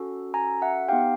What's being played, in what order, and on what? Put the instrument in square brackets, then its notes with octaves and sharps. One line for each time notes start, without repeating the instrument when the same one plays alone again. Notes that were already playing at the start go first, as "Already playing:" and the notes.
Already playing: [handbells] C#4 F#4 A4
G#5 A#5
E5 F#5
B3 D#4 G4 F5 G5